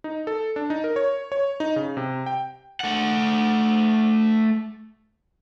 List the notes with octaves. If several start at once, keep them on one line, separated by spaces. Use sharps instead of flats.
D#4
A4
D4
D#4
A#4
C#5
C#5
D#4
C#3
C3
G5
A3 F#5